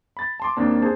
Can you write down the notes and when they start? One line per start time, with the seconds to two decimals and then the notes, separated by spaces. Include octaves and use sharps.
0.17 B5 A6
0.40 A5 C6 D6
0.57 D#2 A#3 C4 D4 A5
0.82 G#4 C5 A5